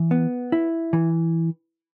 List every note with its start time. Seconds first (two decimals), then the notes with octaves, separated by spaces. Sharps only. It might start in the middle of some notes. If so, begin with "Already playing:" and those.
Already playing: E3
0.11 B3
0.52 E4
0.93 E3